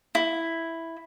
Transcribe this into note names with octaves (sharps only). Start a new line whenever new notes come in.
E4